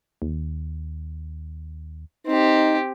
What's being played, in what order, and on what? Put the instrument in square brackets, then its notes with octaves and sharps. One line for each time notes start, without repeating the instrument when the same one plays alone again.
[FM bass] D#2
[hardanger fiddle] C4 G4 [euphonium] D#4